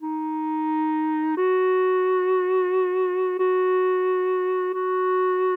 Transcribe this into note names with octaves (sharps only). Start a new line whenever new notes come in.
D#4
F#4
F#4
F#4